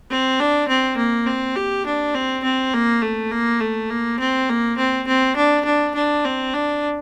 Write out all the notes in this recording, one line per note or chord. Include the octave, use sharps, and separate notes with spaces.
C4
D4
C4
A#3
C4
G4
D4
C4
C4
A#3
A3
A#3
A3
A#3
C4
A#3
C4
C4
D4
D4
D4
C4
D4